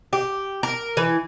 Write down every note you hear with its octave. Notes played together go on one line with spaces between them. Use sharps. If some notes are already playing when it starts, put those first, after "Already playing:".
G4
A#4
E3